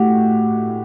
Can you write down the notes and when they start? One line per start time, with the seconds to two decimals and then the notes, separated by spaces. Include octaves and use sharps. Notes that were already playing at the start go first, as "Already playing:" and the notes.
Already playing: A2 F#4 G4